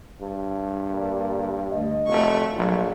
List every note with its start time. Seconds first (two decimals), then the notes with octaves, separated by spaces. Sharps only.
0.21 G2
0.92 D3 A#3 D5
1.72 D2 D#5
2.08 F1 A3 F#4 C#6
2.56 A#1 G#2 F#3 G3 A3